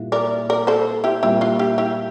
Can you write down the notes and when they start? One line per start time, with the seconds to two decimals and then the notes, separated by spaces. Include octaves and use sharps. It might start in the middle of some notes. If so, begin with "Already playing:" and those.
Already playing: A#2 G3 A#3 E4
0.12 A#4 D5
0.50 A#4 D5
0.67 A4 C5
1.04 E4 G4
1.23 A#2 G3 A#3 C4 E4
1.41 D4 F4
1.59 E4 G4
1.78 E4 G4